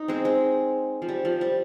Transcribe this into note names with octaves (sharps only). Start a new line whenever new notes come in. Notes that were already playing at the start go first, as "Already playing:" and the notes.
Already playing: D#4
G#3 C4
G#3
F3
G3
F3
G3